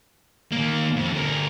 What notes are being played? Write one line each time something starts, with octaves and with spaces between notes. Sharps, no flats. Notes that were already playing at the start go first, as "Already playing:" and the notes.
D#3 A#3
F2
D2 A#4